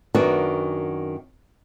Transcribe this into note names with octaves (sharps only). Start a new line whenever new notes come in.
F#2 D#3 B3 D4 F#4